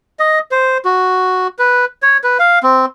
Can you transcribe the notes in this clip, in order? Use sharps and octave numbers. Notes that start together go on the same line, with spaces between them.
D#5
C5
F#4
B4
C#5
B4
F5
C4